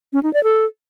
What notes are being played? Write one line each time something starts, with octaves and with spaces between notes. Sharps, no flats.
C#4
D#4
D5
A4